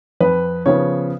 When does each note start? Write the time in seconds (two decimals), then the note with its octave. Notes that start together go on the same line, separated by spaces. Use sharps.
0.20 F2 B4
0.66 C#3 F3 B3 C#5